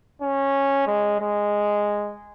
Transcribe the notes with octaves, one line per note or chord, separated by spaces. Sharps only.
C#4
G#3
G#3